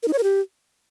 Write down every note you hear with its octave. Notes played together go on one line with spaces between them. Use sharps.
A#4
D#4
C#5
A#4
G4